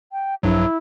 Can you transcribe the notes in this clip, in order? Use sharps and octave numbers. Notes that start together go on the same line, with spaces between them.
G5
A#1 G2 F#3 E4